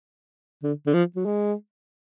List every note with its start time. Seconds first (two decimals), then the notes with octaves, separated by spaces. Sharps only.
0.63 D3
0.87 D3
0.94 F3
1.16 F#3
1.25 G#3